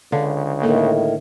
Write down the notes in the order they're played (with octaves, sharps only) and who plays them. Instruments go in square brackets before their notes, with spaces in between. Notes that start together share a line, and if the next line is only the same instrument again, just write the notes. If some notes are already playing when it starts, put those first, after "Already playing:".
[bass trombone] C#2 [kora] D3 [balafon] C#5 F5
[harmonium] A2 D#3 [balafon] A#3 A4 A#4